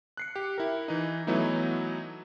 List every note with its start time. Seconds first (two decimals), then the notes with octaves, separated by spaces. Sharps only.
0.17 F#6 C7 C#7
0.36 G4
0.58 E4 A#4
0.88 E3 D#4
1.27 E3 F#3 A3 B3 D#4 E4